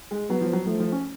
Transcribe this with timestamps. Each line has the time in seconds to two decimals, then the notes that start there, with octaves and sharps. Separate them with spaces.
0.11 G#3
0.30 F#3 B3
0.41 F3
0.53 F#3
0.67 F3 A3
0.80 F3
0.92 C#4